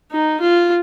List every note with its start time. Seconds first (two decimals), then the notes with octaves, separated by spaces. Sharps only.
0.11 D#4
0.41 F4